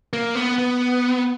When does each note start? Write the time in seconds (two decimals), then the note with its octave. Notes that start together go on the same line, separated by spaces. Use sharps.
0.13 A#3
0.35 B3
0.58 B3